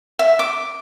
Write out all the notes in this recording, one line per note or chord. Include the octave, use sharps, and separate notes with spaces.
E5
D6